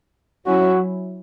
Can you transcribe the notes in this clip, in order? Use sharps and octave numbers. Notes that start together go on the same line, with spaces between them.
F#3 C#4 E4 F#4